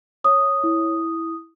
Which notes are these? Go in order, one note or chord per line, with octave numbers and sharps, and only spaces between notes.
C#5 D#6
E4